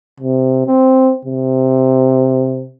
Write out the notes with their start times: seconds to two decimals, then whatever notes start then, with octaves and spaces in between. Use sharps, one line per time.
0.20 C3
0.67 C4
1.25 C3